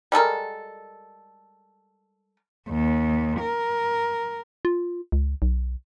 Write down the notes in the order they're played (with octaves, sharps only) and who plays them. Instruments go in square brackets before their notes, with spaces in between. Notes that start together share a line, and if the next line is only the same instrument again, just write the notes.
[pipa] G3 G#3 A4 A#4
[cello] D#2
A#4
[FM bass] F4
C#2
B1